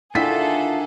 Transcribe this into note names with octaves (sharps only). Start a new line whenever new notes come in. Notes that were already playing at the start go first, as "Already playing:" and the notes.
D3 D#3 E4 F4 G#4 A4 E5 B6